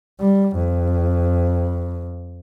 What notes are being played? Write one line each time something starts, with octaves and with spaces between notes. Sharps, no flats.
G3
F2